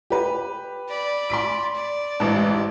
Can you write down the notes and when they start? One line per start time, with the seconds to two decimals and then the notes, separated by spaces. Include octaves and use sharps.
0.10 G4 B4
0.89 D5 B5
1.30 C6 B6 D7
1.75 D5
2.20 A1 G#2 A5